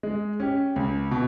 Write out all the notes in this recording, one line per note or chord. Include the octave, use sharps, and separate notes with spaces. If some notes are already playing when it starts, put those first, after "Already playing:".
G#3
C#4 G4
C#2
B2